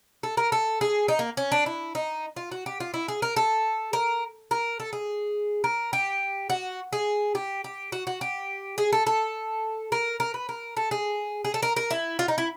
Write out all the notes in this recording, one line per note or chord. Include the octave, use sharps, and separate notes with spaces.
A4
A#4
A4
G#4
D#4
A#3
C#4
D4
E4
D#4
F4
F#4
G4
F4
E4
G#4
A#4
A4
A#4
A#4
A4
G#4
A#4
G4
F#4
G#4
G4
G4
F#4
F#4
G4
G#4
A4
A4
A#4
A#4
B4
A#4
A4
G#4
G#4
A4
A#4
A#4
E4
F4
D#4
E4